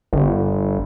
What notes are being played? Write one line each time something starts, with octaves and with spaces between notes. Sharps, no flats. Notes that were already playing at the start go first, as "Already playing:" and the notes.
G1